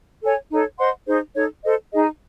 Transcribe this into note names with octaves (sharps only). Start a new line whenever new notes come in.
A4 C#5 G#5
D#4 A4 C#5
C5 D#5 F#5 C6
D#4 G#4 C5
D#4 A4 C#5
A4 C5 D#5
D#4 G#4 D#5